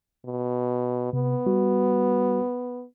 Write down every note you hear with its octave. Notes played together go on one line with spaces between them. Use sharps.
B2
C3 B3
G3 F#4